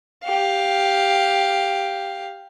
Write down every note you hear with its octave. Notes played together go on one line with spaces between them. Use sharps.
G4 F5